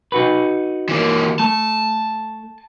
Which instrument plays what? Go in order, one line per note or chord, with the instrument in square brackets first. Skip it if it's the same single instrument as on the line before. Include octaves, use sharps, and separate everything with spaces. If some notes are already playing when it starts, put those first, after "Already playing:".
[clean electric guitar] D#4 F#4 B4
[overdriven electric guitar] E3 A#3
[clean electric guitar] A3 [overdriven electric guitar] A5